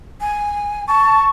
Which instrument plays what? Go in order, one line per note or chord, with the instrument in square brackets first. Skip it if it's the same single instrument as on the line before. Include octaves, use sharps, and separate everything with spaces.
[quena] G#5
[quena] A5 [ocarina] C#6